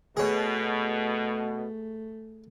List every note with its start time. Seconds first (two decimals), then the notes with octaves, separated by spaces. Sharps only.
0.17 B2 A3 G#4 C#5